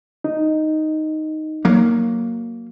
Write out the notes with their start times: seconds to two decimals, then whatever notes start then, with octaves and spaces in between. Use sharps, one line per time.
0.24 D#4
1.65 F#3 A#3